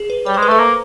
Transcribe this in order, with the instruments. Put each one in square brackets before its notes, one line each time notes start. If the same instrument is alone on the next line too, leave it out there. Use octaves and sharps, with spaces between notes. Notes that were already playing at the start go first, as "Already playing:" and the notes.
Already playing: [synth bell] G#4
B4
[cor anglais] G3 [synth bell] C#5
[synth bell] C5
[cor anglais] G#3
[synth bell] B4
[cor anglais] A3 [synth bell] A4
[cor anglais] A#3